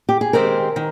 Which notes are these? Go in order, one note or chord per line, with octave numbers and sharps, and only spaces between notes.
G4
G#4
D#3 G#3 C4 G4 A#4 C5
D#3